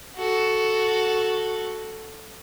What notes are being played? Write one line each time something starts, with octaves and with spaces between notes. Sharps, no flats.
F#4 A4